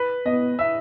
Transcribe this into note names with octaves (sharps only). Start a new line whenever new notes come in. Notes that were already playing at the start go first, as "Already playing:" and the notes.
Already playing: B4
B3 D#5
E5